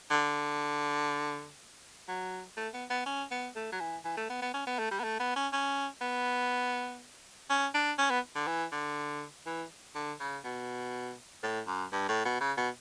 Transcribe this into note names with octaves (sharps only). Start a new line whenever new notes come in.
D3
F#3
A3
B3
B3
C#4
B3
A3
F#3
E3
E3
A3
B3
B3
C#4
B3
A3
G3
B3
A3
B3
C#4
C#4
B3
C#4
D4
C#4
B3
D3
E3
D3
E3
D3
C#3
B2
A2
F#2
G2
A2
B2
C#3
B2